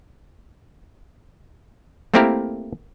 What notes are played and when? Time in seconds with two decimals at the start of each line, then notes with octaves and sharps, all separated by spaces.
2.14 A3 A#3 C4 E4 G4 A#4